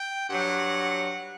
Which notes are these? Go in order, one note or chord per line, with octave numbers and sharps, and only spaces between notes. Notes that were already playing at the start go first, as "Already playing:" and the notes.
Already playing: G5
G2 F#3 F#5